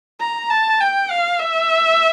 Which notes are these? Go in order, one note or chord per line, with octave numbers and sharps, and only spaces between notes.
A#5
A5
G5
F5
E5